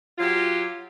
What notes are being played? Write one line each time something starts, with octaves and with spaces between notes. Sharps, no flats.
F#3 F4 G4